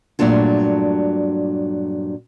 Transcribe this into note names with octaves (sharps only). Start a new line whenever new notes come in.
G2 A#2 F#3 A3 D4 F4